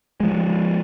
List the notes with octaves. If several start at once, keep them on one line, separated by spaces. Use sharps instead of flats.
F3 G#3